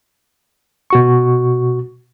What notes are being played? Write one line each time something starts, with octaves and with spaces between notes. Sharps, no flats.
B2 F#4 C#6